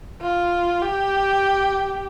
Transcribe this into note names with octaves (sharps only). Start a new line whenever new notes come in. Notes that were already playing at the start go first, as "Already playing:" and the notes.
F4
G4